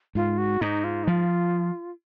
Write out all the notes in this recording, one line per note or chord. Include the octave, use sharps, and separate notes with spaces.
G#2 F4
F#4
G#2 D#4
F4
D#4
F3 F4